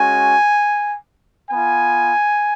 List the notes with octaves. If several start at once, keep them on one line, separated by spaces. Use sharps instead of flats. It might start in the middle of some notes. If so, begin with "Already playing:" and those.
Already playing: G#3 C#4 F#4 G#5
B3 F4 G#5